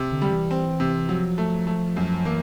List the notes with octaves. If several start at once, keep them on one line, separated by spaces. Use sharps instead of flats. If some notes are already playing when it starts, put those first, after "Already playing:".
Already playing: C3
D3
G3
E3
C4
C3
F3 F#3
A3
A3
F#2
E3 A#3